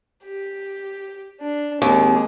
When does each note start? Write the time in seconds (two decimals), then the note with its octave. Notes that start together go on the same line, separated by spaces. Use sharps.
0.24 G4
1.40 D4
1.82 D#2 G#3 A#3 C4